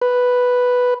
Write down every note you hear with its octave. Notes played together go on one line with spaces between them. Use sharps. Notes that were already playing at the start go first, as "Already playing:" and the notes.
B4